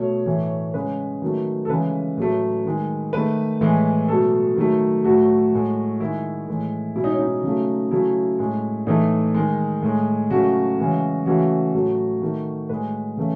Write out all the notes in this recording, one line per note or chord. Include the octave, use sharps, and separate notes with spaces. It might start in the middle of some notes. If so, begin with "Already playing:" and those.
Already playing: B2 A3 C#5
A2 E3 A3
C#3 G#3 B4
D#3 F#3 A3
A4
C#3 E3 G#3 B4
A2 F#3 A3
D#3 G#3
D#3 A3 B4
A2 E3 G#3
B2 F#3 A3 A4
D#3 F#3 A3
A2 F#3 A3 F#4
A2 G#3
D#3 G#3 E4
A2 E3 G#3
B2 G#3 E4
D#4
C#4
D#4
C#3 F#3 A3
C#3 F#3 A3 E4
A2 G#3
A2 E3 A3 D#4
D#3 G#3
A2 G#3
C#3 F#3 A3 F#4
C#3 E3 G#3
C#3 E3 A3 F#4
A2 F#3 A3
D#3 A3
A2 G#3 B4
C#3 E3 A3